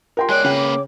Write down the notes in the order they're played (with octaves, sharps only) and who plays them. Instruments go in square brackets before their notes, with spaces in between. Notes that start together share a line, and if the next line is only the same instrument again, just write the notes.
[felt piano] A#4 G5 C6
[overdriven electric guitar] G#3 D5 [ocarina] C#5 [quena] F#6
[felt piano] C#3 G5 [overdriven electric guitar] A#3 B4
[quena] D6